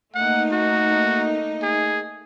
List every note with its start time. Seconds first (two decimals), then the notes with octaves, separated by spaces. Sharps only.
0.15 A3 A#3 D#4 F#5
0.52 F#4
1.63 G#4